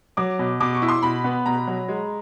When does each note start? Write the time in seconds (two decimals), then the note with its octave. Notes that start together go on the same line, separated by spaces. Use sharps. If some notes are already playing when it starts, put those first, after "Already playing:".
0.17 F#3 D6
0.39 B2
0.60 B2 D6
0.75 C#6
0.82 E4
0.88 C6
1.02 B2 B5
1.24 B3
1.46 B2 A#5
1.67 F#3
1.88 G#3